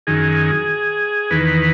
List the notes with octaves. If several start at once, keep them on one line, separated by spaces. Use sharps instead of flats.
F#2 D#3 G#4
E2 D#3 B4